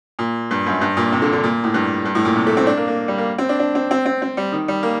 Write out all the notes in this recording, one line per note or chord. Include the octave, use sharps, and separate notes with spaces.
A#2
G2
F#2
G2
A#2
C3
D3
D3
A#2
A2
G2
G2
A2
A#2
C3
A3
C4
D4
A#3
A#3
G3
A#3
C4
D4
D4
C4
C4
C4
C4
G3
D#3
G3
A#3